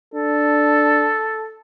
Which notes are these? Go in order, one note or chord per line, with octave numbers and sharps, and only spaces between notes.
D4 A4